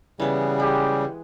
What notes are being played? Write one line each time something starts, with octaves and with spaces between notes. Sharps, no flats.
C#3 E3 G3 B3
G#3 G4